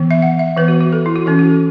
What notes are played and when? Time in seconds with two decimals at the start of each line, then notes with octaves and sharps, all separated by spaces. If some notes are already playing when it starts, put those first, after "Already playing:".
Already playing: E3 B3
0.11 E5
0.22 F#5
0.39 E5
0.57 E3 B3 B4
0.68 F#4
0.81 F#4
0.92 A4
1.06 E4
1.16 F#4
1.26 E3 C#4 A4
1.39 F#4
1.50 A4